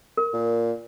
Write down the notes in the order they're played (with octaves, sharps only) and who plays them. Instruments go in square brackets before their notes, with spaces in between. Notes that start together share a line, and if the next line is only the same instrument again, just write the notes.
[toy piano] A#4
[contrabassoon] A#2